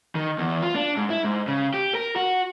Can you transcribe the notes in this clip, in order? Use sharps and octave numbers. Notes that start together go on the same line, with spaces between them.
D#3
E2
F4
D4
G#2
E4
G#2
C#3
G4
A#4
F#4